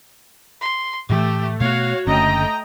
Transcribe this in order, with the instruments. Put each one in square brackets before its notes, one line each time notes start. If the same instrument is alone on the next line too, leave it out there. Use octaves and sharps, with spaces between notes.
[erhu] C6
[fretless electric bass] A2 E3 [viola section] A3 [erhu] G4
[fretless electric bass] B2 A3 B3 [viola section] F#4 C#5 [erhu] F5
[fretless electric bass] F#1 D3 C#4 [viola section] A3 D#5 G5 [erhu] A#5